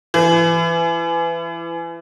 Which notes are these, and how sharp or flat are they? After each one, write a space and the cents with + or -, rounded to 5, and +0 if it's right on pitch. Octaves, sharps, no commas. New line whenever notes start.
E3 +30